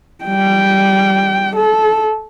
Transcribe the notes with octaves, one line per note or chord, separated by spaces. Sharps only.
G3 G5
A4